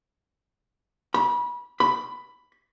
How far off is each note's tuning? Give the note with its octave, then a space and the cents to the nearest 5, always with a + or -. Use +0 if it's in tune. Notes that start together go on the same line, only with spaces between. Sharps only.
B5 -30
B5 +10